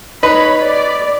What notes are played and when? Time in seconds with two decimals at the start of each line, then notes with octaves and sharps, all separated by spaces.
0.23 D#4 B4 C#5 B5
0.61 D5